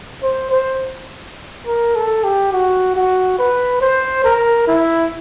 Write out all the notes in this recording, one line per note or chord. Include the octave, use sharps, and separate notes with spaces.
C5
C5
A#4
A4
G4
F#4
F#4
B4
C5
A#4
E4